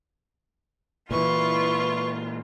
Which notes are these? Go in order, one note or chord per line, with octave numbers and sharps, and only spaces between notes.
A#2 E3 E4 F4 B4 C#6